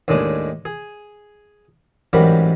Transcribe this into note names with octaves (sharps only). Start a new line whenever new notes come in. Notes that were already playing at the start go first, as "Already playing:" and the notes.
D#2 A2 G#3 D4 D#5
G#4
A1 G#2 F#3 G3 A#4 B5